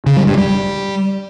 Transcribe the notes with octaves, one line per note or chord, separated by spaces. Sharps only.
C#3
G3
G2
G3